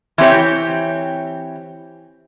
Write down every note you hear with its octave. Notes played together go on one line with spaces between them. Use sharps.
E3 C4 G4 C#5